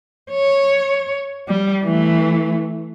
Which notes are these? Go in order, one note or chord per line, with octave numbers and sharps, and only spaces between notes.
C#5
G3
E3 A3